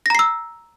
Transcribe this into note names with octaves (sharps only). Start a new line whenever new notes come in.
A#5 E6 A#6 C7